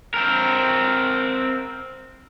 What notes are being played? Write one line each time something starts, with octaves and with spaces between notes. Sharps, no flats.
C4 A#4